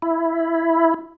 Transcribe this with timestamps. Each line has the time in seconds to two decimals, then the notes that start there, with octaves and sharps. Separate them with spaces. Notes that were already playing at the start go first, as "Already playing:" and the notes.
0.02 E4